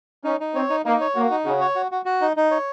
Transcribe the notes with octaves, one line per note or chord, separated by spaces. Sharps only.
C#4 D#4
D#4
C4 C#5
D#4
A#3 D#4
C#5
A#3 F#4
D#4
C#3 F#4
C#5
F#4
F#4
F#4
D#4
D#4
C#5